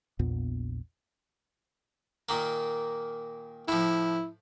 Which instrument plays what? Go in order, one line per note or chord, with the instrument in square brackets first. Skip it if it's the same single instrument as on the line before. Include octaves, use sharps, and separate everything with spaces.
[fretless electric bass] A#1 E2 A#2 B3
[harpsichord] A#2 D#3 A#3
[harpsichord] A2 F3 [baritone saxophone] E4